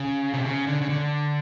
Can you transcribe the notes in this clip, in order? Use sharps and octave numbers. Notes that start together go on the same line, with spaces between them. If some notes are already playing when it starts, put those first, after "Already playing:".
Already playing: C#3
C3
C#3
D3
C#3
D3